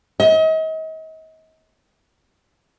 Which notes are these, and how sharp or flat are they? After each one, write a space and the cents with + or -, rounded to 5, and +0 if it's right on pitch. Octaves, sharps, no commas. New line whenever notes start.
D#5 +40